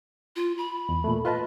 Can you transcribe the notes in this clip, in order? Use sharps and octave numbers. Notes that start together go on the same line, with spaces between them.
F4
B5
E2
A#2 A3
F4 B4 D#5 A5